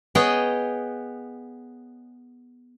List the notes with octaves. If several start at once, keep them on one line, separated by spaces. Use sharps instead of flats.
B3 G#4 C#5 D#5 G5